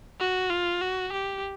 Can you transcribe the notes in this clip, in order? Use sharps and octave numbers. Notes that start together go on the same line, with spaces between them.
F#4
F4
F#4
G4